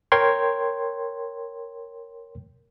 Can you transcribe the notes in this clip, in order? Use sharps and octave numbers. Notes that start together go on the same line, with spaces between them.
A#4 C#5 G5 C6 G#6